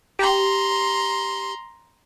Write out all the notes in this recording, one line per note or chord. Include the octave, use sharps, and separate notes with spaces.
G4 A#5 C6